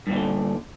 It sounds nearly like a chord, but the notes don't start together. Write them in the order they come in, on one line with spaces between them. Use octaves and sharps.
G2 A#2 E3 D3